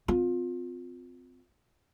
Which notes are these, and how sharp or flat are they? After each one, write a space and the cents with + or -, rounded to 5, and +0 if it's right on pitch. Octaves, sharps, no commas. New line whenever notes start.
C4 -25 F4 +25